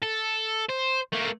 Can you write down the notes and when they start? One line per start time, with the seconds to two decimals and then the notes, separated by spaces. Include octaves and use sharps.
0.03 A4
0.69 C5
1.13 A3 A#3